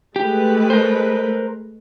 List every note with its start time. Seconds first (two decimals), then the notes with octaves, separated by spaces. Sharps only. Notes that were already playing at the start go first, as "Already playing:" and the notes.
0.16 G#3 A3 G4 B4
0.70 A#4 C5